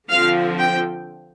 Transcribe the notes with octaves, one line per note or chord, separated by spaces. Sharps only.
D3 F3 C4 F5
G5